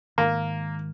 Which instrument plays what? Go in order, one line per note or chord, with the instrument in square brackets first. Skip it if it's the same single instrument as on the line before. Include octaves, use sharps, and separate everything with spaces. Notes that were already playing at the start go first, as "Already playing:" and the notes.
[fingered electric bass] G#2 D#3 [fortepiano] A#3